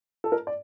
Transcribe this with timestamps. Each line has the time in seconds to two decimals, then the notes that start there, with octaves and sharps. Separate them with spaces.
0.24 A4
0.32 A#4
0.47 D5